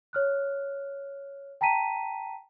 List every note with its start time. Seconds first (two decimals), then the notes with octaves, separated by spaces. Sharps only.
0.13 C#5 F6 F#6
1.61 G5 A5 A#5 B6 D#7